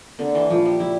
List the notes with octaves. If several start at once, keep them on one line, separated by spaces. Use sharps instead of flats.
D3 A#3
E3
A#1 F3
G3
F3 E4